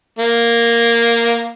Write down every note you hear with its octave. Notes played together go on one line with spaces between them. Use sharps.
A#3